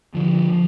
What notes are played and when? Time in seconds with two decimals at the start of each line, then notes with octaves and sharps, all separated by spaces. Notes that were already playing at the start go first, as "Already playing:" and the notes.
0.14 D3 F3
0.52 F3